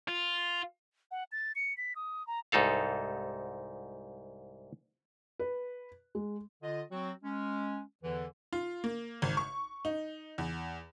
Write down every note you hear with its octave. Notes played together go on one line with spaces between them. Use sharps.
F4
F#5
A6
C#7
B6
D#6
A#5
C2 G#2 D#4 A4 F5
B4
G#3
D3 F4 D#5
F#3 C4 F#4
G#3 C#4
E2 D3 E3
F4
A#3
G#1
C#6
D#4
E2